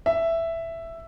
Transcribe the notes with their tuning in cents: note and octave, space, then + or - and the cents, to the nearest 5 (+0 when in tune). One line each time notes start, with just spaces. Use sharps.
E5 +5